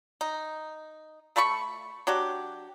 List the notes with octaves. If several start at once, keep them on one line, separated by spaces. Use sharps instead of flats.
D#4
A3 A5 B5 C#6
F#3 D4 F#4 G4